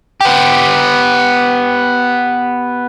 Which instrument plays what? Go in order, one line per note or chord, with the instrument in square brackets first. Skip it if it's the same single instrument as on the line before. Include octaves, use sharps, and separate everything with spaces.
[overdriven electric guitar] B3 G4